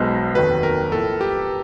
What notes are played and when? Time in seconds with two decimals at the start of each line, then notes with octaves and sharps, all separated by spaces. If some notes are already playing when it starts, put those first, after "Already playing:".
Already playing: B1 B2 G#3 B3 C5
0.35 F1 D#2 D#3 F#3 B3 B4
0.63 A#4
0.92 A2 F3 A#3 A4
1.21 G4